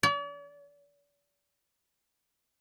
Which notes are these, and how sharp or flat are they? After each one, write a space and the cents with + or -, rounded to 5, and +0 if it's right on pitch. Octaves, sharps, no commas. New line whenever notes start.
D5 -45